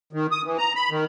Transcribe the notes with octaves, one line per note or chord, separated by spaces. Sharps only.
D#3
D#6
E3
A#5
B5
D#3